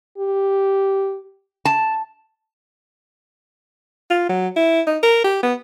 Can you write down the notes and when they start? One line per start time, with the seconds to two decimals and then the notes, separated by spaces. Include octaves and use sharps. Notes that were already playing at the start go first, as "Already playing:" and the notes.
0.18 G4
1.65 A5
4.10 F4
4.29 F#3
4.56 E4
4.87 D#4
5.03 A#4
5.24 G4
5.43 B3